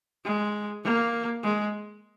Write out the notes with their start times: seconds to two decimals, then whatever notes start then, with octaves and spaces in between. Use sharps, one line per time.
0.25 G#3
0.84 A#3
1.43 G#3